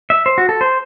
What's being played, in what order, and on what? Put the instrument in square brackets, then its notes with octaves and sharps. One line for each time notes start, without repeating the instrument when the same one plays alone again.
[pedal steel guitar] E5
C5
F#4
A4
C5